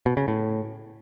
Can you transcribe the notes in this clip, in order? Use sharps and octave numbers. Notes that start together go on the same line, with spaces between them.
B2
C#3
A2